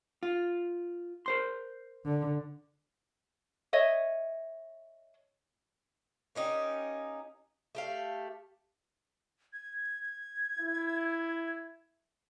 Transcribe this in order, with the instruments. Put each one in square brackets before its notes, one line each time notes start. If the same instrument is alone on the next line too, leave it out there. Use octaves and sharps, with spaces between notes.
[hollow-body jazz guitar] F4
A#4 C5 C6
[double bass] D3
[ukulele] C#5 D#5 E5
[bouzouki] A#3 C#4 D#4 G4
A3 G4 F5
[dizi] G#6
[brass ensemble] E4